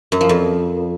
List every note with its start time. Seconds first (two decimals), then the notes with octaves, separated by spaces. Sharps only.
0.12 F#2
0.21 F3
0.29 F2